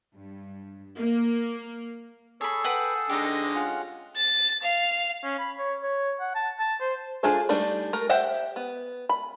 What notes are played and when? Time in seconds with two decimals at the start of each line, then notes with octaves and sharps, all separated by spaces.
0.16 G2
0.97 A#3
2.41 G#4 A4 C#5 B5
2.64 B4 F#5 G5
3.10 D3 G#3 D#4 G4
3.55 C#4 F4 F#5
4.16 A6
4.63 F5
5.24 C#4
5.39 B5
5.58 C#5
5.83 C#5
6.20 F#5
6.35 A5
6.59 A5
6.81 C5
7.23 D4 F4 G#4 A4 C5
7.49 G3 A3 D4 D#4
7.93 A3 A#4
8.09 G4 C5 E5 F#5 G5
8.56 B3
9.09 B5